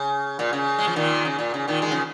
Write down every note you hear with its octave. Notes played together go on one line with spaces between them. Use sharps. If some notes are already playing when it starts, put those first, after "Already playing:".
Already playing: C#3
A#2
C#3
G#3
F3
A#2 D#3
C#3
A#2
C#3
A#2 D#3
D#3 G#3
C#3 F3